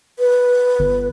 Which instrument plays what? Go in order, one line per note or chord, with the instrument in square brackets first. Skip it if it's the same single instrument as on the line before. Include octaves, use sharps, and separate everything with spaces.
[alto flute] B4
[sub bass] G1